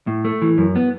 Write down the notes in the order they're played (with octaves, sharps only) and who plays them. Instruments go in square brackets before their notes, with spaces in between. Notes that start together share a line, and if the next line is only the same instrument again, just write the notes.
[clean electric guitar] A2
A3
E3
F#2
B3